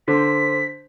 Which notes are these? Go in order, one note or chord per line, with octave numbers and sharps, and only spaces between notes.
D3 C5 B6